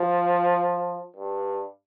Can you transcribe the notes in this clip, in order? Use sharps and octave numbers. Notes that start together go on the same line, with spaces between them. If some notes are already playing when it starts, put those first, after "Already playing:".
Already playing: F3
G2